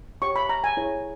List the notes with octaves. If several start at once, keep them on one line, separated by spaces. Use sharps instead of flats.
G4 C#5 C#6
B5
A#5
G#5
E4 G#4 C#5